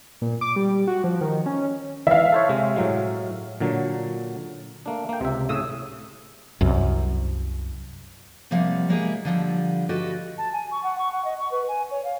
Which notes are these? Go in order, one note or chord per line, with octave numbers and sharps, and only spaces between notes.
A#2
D6
G3
F#4
F3
D#3
C#4
E3 E5 F5
A4 C5 C#5
C3 G#3
A2 F#3 G#3
A#2 D3 F#3
A3 A#3 D4
A#3 G5
C#2 C3 C5 E5
A2 C#3 C#5 D#6 E6
C2 F#2
C3 F3 G3 A#3 F#5
G#3 A#3 E4 G4 G#4
D3 F3 G3
F#4 G4 A4 B4 D#5
A5
G#5
C#6
F#5
C#6
F#5
D#5
C#6
B4
G#5
C#5
F5